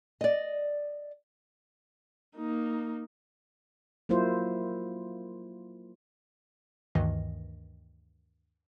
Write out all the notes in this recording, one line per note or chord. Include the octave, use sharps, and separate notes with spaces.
D5 D#5
A#3 D#4
F#3 A#3 E4 F4 C5
D2 G2 D#3 E3 D#5